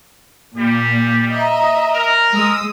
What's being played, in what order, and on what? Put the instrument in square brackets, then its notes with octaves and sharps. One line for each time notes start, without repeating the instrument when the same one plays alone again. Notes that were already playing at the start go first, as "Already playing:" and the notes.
[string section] A#2 [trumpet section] G3 G4
[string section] D#5 E5 A#5
[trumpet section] A#4
[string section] G#3 D#6 E6